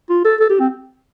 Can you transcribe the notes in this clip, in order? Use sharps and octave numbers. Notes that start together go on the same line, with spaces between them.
F4
A4
A4
G4
C4